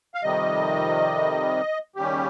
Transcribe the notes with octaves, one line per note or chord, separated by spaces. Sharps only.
F5
F2 C3 D#3 G3 D#5
D#2 C#3 G3 C#4 G4